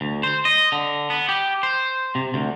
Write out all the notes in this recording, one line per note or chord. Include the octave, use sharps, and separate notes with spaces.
D2
C5
D#5
D3
B3
G4
C5
C3
D2